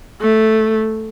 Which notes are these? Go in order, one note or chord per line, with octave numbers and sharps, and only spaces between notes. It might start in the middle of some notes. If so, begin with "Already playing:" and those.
A3